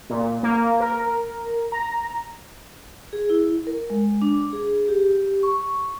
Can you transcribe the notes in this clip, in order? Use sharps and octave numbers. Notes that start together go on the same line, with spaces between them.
A#2
A#3
A#4
A#5
G#4
E4
A#4
G#3
D4
G#4
G4
C#6